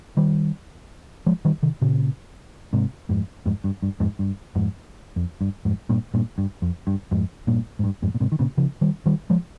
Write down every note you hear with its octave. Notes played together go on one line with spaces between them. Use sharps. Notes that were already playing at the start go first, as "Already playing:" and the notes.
D#3 G3
F3 G#3
D#3 G3
C3 D#3
A#2 C#3
G#2 C3
F2 G#2
F2 G#2
G2
G2
F2 G#2
G2
F2 G#2
F2
G2
F2 G#2
G2 A#2
G2 A#2
G2
F2
G2
F2 G#2
G2 A#2
G#2
G2
F2 G#2
A#2
G#2 C3
D#3
A#2 C#3
C#3 F3
D#3 G3
D#3 G3
F3 G#3